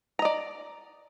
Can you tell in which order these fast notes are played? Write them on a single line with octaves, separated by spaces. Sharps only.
A#5 D#5 D5